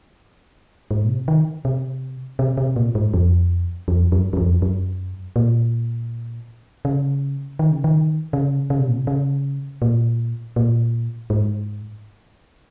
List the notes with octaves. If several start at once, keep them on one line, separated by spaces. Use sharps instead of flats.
G#2
A#2
C3
D#3
C3
C3
C3
A#2
G#2
F2
F2
F#2
F#2
F2
F#2
A#2
C#3
D#3
C#3
D#3
C#3
C#3
C3
A#2
C3
C#3
A#2
A#2
G#2